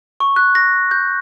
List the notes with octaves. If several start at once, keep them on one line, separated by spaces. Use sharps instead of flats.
C#6
F#6
A#6
G6